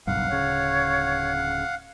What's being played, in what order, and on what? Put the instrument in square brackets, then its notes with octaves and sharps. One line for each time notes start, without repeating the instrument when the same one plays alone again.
[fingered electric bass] F#1 B1 G2 [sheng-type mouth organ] F5 F#5
[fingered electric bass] D1 C#3 [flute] C#5